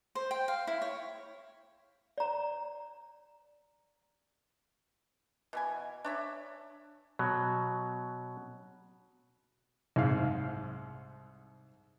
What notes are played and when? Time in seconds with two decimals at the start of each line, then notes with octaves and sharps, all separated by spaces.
0.15 C5
0.31 G5
0.48 F5
0.67 E4
0.82 C#5
2.18 D5 A#5
5.53 B2 E3 G#5
6.05 D4 C#5 E5
7.19 B2 F#3
9.96 C2 G#2 F5